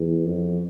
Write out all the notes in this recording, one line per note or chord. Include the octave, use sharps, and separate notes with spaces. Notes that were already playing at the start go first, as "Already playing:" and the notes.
Already playing: E2
F2